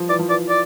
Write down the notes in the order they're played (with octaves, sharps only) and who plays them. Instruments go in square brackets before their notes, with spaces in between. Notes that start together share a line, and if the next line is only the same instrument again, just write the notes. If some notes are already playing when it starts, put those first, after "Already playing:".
Already playing: [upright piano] F3 G3
[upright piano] E3 [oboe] D5
[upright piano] F3
[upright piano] E3 [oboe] D5
[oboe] D5